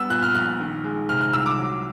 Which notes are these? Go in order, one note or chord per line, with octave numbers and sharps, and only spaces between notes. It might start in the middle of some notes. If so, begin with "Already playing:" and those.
Already playing: G3 B3 E6
A#2 F#6
F6
A#1 F#6
D#3
G#3
C3 F6
F6
C2 E6
D6
F#3